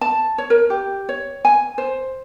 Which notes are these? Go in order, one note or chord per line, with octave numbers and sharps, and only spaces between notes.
A5
C#5
A#4
G4
C#5
G#5
C5